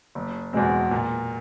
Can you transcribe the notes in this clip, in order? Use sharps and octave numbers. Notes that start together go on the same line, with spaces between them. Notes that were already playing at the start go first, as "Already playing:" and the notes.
F#1
E2 B2 G#3 C4
A#2